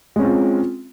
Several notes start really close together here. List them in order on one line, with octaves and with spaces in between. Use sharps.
G#3 C#4 C4 F4